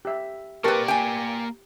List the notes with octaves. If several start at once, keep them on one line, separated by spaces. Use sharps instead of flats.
G4 E5
A#3 G4 A#4 B4 D5 A5 C#6
G5 G#5